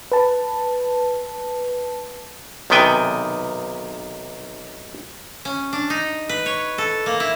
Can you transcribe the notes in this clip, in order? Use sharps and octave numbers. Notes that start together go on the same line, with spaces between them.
B4 A5
B1 C3 D#3 B3 G5 G#5
C#4
D4
D#4
B4
C#5
A4
A#3
E4